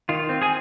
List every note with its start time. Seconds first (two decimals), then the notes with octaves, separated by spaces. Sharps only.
0.09 D#3 F4
0.29 C4
0.42 G#4 G#5